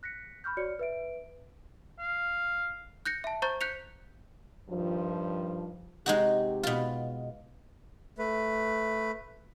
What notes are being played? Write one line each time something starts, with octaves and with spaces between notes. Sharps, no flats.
F#6 A#6 B6 C#7
B5 C#6 F6 G6
F#4 C#5 D5 F6 C#7
B4 E5 D7
F5
F#6 G6 A#6 C#7
E5 A5
C5 A#5 C#6 G6 A6
F#6 G6 B6 C#7 F7
G2 D#3 F3
C3 G#3 D#4 F#4 G4
B2 F4
A3 B4